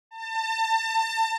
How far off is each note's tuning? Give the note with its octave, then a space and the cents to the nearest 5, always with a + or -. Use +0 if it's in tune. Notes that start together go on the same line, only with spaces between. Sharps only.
A5 +35